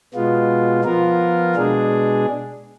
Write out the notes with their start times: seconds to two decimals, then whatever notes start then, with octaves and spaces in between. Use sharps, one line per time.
0.14 B2 G#3 B3 F4
0.84 F3 B3 F4 A#4
1.55 B2 G#3 D4 G#4